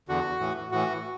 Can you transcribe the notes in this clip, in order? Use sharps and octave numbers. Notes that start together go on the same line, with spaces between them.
E2 D3 F#4
A2 E3
A2 E3 F#4